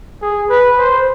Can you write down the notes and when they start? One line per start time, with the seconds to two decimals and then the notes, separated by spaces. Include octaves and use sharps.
0.22 G#4
0.49 B4
0.79 C5